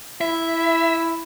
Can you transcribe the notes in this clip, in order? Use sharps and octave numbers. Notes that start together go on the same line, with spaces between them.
E4 E5